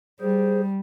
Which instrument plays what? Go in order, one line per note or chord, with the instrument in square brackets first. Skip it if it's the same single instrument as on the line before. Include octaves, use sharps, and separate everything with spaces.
[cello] G3 [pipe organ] G#4 C5